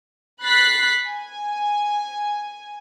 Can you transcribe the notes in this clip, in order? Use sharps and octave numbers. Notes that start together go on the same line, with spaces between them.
B5 F#6 A6 B6 C7
G#5